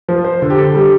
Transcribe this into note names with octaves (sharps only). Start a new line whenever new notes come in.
F3
C5
D3
G4
A4
G3 G4